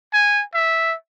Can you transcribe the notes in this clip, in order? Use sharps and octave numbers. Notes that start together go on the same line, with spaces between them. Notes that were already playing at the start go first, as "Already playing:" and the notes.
G#5
E5